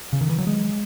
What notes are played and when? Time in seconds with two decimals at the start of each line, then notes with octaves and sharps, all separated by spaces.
0.13 C#3
0.21 D#3
0.29 E3
0.38 F#3
0.47 G#3